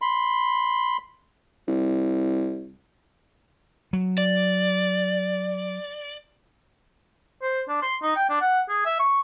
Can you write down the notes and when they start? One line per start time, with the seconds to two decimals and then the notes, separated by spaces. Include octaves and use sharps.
0.02 B5 C6
1.68 C2
3.93 F#3
4.18 D5
7.42 C5
7.68 D4
7.82 C6
8.03 D#4
8.16 G5
8.30 D4
8.41 F#5
8.69 G#4
8.86 E5
9.00 C#6